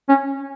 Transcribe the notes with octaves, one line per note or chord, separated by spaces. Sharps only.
C#4